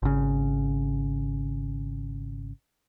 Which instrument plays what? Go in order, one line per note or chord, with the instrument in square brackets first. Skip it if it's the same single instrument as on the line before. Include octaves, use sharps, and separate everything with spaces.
[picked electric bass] G#1 C#3